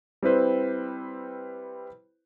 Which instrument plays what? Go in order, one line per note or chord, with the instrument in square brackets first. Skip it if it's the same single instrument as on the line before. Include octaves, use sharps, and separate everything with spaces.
[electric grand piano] G3 C4 E4 B4 C5